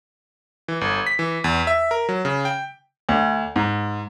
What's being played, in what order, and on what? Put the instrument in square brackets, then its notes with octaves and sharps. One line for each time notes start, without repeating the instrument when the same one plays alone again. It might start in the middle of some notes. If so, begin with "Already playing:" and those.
[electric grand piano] E3
G1
B6
E3
E2
E5
A#4
F#3
C#3
G5
[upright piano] D2
G#2